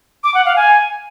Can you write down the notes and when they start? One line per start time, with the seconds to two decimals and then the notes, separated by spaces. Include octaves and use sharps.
0.24 D6
0.34 F#5
0.45 F5
0.56 G#5